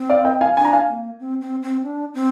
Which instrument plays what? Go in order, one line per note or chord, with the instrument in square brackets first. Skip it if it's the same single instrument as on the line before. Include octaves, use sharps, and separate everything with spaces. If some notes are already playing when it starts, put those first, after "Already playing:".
Already playing: [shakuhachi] C4
[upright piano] D5 F5
D#5 G5
F5 G#5
[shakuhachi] D4 [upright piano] G#5
[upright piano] A#5
F5 G#5
[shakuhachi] A#3
C4
C4
C4
D4
C4